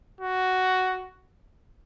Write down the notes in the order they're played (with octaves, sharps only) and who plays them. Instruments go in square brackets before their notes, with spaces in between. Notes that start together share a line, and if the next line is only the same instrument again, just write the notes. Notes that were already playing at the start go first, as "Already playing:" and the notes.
[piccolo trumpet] F#4